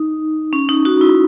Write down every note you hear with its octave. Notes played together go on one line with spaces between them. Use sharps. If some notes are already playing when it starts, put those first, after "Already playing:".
Already playing: D#4
C#4
D#4
D#4 F#4
E4